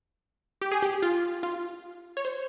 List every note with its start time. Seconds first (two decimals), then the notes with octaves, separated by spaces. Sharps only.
0.62 G4
0.71 G#4
0.83 G4
1.02 F4
1.43 F4
2.17 C#5
2.25 C5